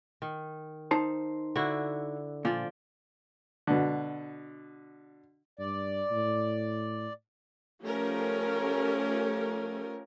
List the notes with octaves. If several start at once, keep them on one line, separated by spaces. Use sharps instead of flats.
D#3
D#4 C5 A5
D3 E4 F#4
A#2 F3 D5
B2 D3
G2 D5
A2
F3 A3 C#4 G4 A#4